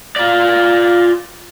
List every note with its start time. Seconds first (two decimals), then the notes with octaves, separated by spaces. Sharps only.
0.16 F4 D5